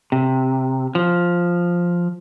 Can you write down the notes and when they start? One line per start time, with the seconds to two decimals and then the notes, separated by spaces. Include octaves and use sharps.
0.12 C3
0.95 F3